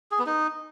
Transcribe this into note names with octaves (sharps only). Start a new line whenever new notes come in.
G#4
B3
D#4